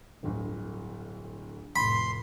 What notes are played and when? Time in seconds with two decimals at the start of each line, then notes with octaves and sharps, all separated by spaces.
0.23 D1 G1 D2
1.76 F1 A2 B5 C6